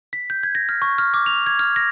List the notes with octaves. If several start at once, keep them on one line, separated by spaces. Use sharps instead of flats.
B6
G6
G#6
A#6
F6
C#6
F6
D6
F7
G#6
F6
A#6